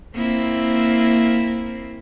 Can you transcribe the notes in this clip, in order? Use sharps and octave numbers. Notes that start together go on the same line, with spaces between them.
A#3 C4 E4